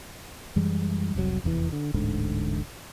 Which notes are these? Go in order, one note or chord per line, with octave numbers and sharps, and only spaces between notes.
F#2 E3 G3 G#3
F1 C2 A#2 F#3
F1 E2 B2 E3
D3
D1 A1 G#2 D3